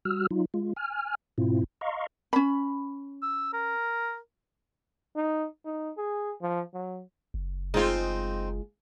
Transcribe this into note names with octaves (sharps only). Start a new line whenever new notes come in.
G3 F#4 E6 F6
F#3 D#4 F4
G#3 F4
G#5 F6
G#2 B2 C4 E4 F4
D#5 F5 A#5 C6 C#6
C#4 B5
E6
A#4
D#4
D#4
G#4
F3
F#3
F#1
G#3 C4 D#4 F4